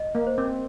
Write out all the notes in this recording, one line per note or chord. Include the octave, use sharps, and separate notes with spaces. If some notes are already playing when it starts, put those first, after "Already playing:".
Already playing: D#5
A#3
C5
C4